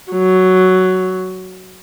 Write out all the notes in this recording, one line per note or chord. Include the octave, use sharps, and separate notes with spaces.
F#3